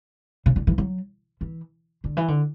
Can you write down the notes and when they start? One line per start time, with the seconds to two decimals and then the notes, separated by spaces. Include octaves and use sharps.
0.46 C#3
0.56 D3
0.67 E3
0.78 F#3
1.41 E3
2.04 D3
2.17 E3
2.28 D3